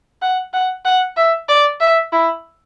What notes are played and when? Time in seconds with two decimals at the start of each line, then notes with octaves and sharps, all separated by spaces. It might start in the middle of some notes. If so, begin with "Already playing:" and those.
0.22 F#5
0.53 F#5
0.85 F#5
1.17 E5
1.49 D5
1.80 E5
2.12 E4